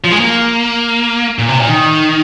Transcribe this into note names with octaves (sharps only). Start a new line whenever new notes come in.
F3
G#3
A#3
A#2
C3
A#2
D#3